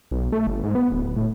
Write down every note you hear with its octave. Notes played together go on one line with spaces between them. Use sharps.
B1
A3
G1
G#2
B3
D1
A2